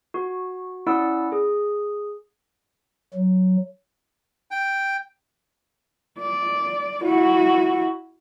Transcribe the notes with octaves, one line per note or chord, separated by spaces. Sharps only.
F#4
C#4 E4 D5 F#5 E6
G#4
F#3
G5
D5
E4 F#4